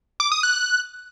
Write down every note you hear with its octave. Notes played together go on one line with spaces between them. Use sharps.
D6
D#6
F#6